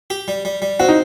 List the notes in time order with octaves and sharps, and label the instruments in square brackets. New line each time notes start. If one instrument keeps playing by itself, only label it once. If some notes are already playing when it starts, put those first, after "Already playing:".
[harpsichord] G4
G3
G3
G3
[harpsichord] C4 [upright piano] F#4
[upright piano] D#4